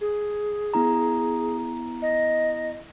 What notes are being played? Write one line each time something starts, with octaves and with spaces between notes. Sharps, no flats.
G#4
B3 E4 A#5
D#5